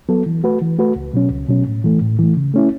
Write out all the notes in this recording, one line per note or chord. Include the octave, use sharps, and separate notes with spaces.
F#3 B3 A4
E3
A3 F#4 B4
E3
A3 F#4 B4
C#2
B2 F#3 C#4
C#2
B2 F#3 C#4
A2
E3 A3
A2
E3 A3
C#3
A3 C#4 E4